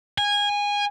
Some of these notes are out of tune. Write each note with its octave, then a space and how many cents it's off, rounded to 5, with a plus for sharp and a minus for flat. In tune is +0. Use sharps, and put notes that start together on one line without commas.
G#5 -20